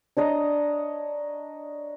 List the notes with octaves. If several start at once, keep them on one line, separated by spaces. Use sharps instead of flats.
D4 C#5 D#5 A#5